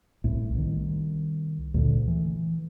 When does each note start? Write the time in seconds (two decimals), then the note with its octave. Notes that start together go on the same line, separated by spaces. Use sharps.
0.24 C2 A2
0.54 C2 D#3
1.74 D2 A#2 D3
2.08 E3